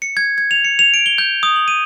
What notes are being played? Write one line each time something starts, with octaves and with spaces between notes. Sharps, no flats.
C#7
G#6
G#6
F7
C#7
F7
D7
G7
G6
D#6
F#7
D#7